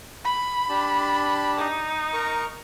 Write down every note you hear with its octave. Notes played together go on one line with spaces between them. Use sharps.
B5
D4 G4 A5
D#4
A#4 A#5 C#6